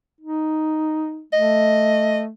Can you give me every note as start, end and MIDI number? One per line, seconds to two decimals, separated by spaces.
0.21 1.23 63
1.33 2.30 57
1.33 2.21 75